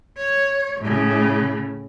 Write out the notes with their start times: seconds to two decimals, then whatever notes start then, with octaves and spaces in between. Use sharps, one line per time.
0.17 C#5
0.80 A2 C#3